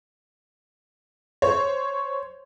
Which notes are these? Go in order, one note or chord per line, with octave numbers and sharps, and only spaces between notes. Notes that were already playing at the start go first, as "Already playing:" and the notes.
C5 C#5